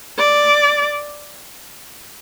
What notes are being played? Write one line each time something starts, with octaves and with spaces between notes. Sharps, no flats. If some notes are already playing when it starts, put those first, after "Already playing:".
D5